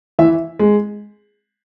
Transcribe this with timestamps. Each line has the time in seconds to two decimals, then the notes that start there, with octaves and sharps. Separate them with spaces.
0.19 E3 E5
0.59 G#3